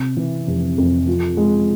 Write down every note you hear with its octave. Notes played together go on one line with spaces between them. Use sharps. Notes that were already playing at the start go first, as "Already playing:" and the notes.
Already playing: C3
E3
F1
F2
F3
G#3